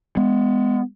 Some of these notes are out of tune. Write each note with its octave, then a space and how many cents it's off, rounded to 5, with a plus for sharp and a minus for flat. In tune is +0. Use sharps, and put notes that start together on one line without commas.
G#3 -10 B3 +20